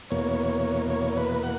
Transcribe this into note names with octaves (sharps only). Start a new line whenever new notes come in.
E2 B2 A#3 C#5
C#5
C#5
B4
F#5